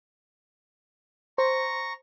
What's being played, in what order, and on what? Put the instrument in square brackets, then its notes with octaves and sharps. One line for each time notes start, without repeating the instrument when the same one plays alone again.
[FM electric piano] C5 [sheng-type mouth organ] A#5 C#6